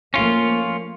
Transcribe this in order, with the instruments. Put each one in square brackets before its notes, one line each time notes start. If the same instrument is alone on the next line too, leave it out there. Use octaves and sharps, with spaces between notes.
[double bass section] F3 A3 A#3 [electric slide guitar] C#4 F4